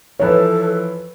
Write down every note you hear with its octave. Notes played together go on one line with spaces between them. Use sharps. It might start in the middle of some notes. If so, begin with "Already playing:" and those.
E3 F3 A4 B4 C#5